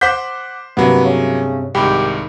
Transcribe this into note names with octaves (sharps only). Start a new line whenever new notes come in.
C5 F#5 D6 F#6 G6 B6
G2 C3 F#3 A#3 B3
C#3
C2 G#2 D#3 G4 B5